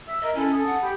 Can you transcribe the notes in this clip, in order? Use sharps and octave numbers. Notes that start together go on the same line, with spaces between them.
E5 E6
A#4 D#5
C#4 E4 A4 G#5
A4 G#5 D#6
F#5
G4 B5